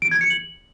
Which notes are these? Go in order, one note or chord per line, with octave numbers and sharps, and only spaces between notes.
D7
G#6
C#7
F#7